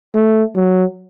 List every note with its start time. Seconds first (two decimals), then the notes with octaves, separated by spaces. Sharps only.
0.15 A3
0.55 F#3